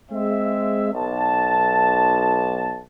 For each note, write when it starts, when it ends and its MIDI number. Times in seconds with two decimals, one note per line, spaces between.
0.11 0.89 56
0.11 0.89 60
0.11 0.89 76
0.94 2.82 35
0.94 2.82 81